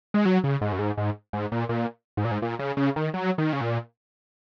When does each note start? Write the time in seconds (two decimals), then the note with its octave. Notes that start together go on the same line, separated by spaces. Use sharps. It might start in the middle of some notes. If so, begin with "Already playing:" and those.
0.14 G#3
0.25 F#3
0.44 C#3
0.61 G#2
0.72 F#2
0.79 G#2
0.97 G#2
1.33 G#2
1.52 A#2
1.69 A#2
2.17 G#2
2.25 A#2
2.31 G#2
2.42 A#2
2.59 C#3
2.77 C#3
2.96 D#3
3.14 F#3
3.38 D#3
3.53 C#3
3.61 A#2